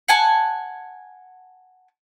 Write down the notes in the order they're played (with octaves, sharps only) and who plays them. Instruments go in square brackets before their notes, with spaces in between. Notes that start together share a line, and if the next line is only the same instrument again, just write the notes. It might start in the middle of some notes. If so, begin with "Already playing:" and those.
[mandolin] F#5 G#5 A5